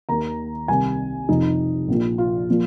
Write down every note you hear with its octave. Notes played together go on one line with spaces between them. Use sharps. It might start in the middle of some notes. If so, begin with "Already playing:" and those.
D#2 D#3 A#5
C2 C3 D#3 G#5
F1 F2 F3 D#4
A#1 A#2 F3
F4
A#2 F3